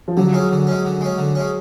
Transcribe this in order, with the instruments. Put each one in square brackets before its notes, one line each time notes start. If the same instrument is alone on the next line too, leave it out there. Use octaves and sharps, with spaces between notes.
[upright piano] F3
[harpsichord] D3 [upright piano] F#3
[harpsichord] G#3 C#4
D3
G#3 C#4
D3
G#3 C#4
D3
G#3 C#4